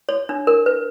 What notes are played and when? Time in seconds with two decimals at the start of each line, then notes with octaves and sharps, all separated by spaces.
0.09 C#5
0.29 D4
0.47 A#4
0.66 B4